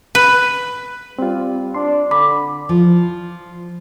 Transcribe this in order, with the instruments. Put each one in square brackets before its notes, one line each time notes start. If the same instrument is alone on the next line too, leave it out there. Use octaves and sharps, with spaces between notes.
[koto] B4
[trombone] G3 [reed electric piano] C4 F4
[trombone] D4 [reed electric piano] C6
[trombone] D3 [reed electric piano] B5 [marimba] D6
[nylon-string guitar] F3